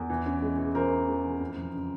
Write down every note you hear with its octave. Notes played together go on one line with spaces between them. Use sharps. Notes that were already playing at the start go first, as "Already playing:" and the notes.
Already playing: E2
E3
C#4
G#3
E3
E3 A#4 C5
C#4
G#3
E3
F2
F3
C#3